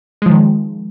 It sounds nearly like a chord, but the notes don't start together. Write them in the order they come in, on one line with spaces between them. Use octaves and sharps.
G#3 F3 D#3